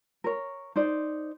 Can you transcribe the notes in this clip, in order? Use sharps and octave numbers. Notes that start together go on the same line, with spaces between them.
A#4 C#5
D#4 C5 D5